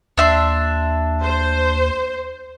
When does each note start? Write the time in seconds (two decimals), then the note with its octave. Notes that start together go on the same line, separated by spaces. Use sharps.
0.17 D#2 D4 E5 C6
1.22 C5